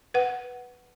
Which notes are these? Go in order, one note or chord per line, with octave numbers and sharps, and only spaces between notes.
B4 F#5